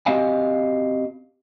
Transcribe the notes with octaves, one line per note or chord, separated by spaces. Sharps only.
C4 F#4 G4 D#5 F5 G#5